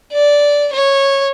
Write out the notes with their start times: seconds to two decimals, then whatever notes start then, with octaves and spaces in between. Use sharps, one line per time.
0.12 D5
0.73 C#5